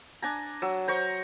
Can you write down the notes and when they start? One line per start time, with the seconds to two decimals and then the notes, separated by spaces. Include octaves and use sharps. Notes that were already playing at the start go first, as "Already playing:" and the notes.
0.22 D4 G#5 A#5
0.62 F#3 E6
0.88 C5 A#5 C#6